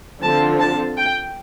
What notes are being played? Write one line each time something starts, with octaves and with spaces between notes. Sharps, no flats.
D3 F3 C4 F4 A5
A5
G5